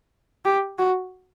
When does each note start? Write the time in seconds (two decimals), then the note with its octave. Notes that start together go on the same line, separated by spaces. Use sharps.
0.45 G4
0.78 F#4